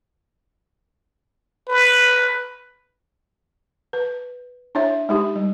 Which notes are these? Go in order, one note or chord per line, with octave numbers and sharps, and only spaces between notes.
B4
B4
D4 E4 C#5 E5
G#3 D#4 G4
G3